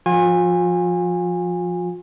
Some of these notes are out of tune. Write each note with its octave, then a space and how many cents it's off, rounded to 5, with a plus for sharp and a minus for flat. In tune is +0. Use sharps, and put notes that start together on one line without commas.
F3 +0 F4 +40 G#5 -25